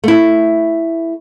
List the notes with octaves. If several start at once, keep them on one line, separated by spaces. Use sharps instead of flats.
A3 E4